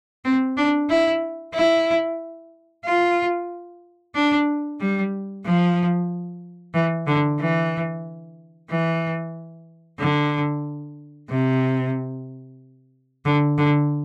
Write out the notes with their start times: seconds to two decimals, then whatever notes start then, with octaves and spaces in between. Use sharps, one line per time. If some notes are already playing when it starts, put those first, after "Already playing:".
0.25 C4
0.57 D4
0.90 E4
1.54 E4
2.85 F4
4.15 D4
4.80 G3
5.45 F3
6.74 E3
7.07 D3
7.40 E3
8.70 E3
10.00 D3
11.30 C3
13.25 D3
13.58 D3